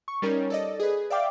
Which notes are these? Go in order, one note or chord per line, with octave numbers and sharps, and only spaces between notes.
C#6
G3 C#4 D#4 A#4 C#5
A4 D5 D#5
G#4 B4
D5 E5 F5 G5 D6